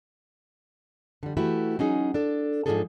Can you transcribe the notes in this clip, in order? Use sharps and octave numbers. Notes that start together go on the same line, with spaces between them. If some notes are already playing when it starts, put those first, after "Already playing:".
D3 G3
E3 A3 E4 F#4 G4
F#3 C#4 D#4 G#4
D4 A4
G#2 D#3 F3 D4 G#4 A4